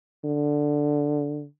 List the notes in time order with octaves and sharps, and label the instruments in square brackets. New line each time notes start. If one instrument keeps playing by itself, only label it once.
[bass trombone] D3